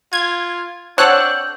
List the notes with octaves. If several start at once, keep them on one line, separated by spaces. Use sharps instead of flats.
F4 G#6
C4 D4 A4 C#5 F#5 F#6 G6